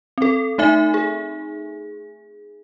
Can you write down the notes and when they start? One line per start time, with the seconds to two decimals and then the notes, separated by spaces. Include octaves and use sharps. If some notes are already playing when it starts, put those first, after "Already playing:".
0.18 C4 A4
0.58 A3 D#4 E5 G#5
0.94 G#4